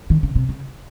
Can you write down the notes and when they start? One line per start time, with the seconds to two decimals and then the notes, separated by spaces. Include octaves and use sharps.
0.10 D#3
0.23 C#3
0.35 C3
0.49 C#3